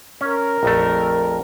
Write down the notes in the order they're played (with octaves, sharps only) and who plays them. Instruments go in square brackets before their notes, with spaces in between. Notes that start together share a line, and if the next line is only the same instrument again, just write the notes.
[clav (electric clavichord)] C#4 [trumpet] A#4
[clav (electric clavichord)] A#1 F2 A3